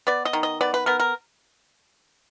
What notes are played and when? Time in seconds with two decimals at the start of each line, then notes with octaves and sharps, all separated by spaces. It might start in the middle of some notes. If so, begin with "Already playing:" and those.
0.07 B3 D5
0.25 D#5
0.33 D#3
0.43 D#5
0.61 B3 D5
0.74 B4
0.86 B3 A#4
1.00 A#4